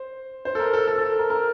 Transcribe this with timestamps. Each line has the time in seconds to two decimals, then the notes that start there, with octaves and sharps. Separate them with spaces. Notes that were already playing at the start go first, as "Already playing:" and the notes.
Already playing: C5
0.45 C5
0.55 A4
0.60 A#4
0.74 A4
0.87 A4
0.98 A4
1.19 A#4
1.30 A#4